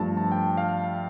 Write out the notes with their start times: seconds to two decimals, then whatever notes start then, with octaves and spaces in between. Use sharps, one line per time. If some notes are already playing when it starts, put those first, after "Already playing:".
Already playing: G2 F3 A3 A5
0.17 A5
0.32 G5
0.57 F5